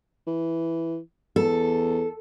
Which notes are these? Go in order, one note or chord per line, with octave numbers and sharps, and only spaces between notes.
E3
E2 A4